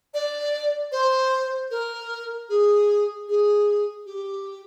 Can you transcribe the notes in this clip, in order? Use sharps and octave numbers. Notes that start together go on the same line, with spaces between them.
D5
C5
A#4
G#4
G#4
G4